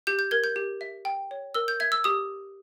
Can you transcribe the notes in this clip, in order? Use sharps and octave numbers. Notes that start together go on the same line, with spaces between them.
G4 G6
G6
A#4 G#6
G6
G4
E5
G5
C#5
A#4 E6
G6
E5 G#6
E6
G4 D#6